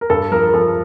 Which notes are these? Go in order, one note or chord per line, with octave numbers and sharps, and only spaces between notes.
A#4
G2 A4
F3 A#4
A#4
F3 A4